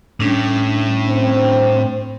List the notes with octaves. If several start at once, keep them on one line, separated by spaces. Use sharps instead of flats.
A2 G3 C#4 D4
C4